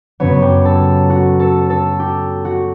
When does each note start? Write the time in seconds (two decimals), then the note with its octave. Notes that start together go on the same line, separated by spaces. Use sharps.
0.20 F#2 C#3 F#3 B3 C#5
0.42 G4
0.65 A4
1.10 F#4
1.40 A4
1.70 A4
1.99 G4
2.45 F#4